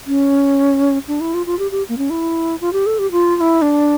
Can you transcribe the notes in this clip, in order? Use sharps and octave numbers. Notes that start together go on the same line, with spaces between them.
C#4
D4
E4
F4
F4
G4
G4
A#3
C#4
E4
F4
G4
A4
G4
F4
F4
E4
D4